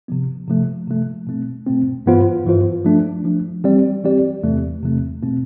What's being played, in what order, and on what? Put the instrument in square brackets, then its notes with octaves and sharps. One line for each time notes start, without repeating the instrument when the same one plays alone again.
[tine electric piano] C3 F3 B3
C3 F3 A3
C3 F3 A3
B2 A3 C4
B2 A3 C4
G2 E3 B3 F4 C5
G2 E3 B3 F4 C5
F3 A3 D4
F3 A3 D4
E3 G3 C4 G4 D5
E3 G3 C4 G4 D5
E2 C3 E3 A3 C4
E2 C3 E3 A3 C4
B2 A3 C4